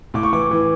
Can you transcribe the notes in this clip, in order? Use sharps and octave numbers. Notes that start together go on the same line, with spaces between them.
A2 D6
C#6
E3 D6
E3